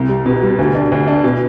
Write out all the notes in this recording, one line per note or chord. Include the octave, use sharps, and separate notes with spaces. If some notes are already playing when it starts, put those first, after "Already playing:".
Already playing: C2
G3
B2
G3
D2
D4
D2
D4
B2